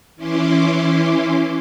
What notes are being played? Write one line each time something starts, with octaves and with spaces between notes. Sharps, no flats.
E3 C#4 E4 C6 D6